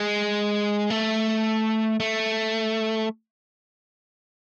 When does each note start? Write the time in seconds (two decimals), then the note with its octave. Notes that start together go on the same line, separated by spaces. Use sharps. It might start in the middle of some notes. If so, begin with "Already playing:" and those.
Already playing: G#3
0.90 A3
2.00 A3